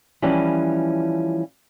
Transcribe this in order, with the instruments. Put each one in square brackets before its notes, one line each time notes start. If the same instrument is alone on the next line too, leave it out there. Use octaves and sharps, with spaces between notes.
[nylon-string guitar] E3 F3 G3 C#4 E4